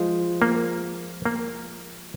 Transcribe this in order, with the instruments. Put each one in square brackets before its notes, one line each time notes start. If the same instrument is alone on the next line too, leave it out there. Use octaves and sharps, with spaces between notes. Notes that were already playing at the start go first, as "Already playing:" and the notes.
Already playing: [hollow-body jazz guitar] F3 G#3 F4
[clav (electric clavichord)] A#3
A#3